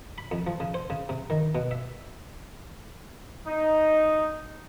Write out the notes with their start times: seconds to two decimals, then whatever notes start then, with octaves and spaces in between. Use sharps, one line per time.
0.18 B5
0.32 F2
0.47 F3
0.60 C#3
0.74 C5
0.90 C#3
1.09 C3
1.30 D#3
1.55 B2
1.71 E5
3.45 D#4